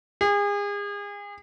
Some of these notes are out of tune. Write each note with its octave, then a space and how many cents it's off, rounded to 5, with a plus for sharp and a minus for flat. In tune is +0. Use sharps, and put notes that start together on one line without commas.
G#4 -35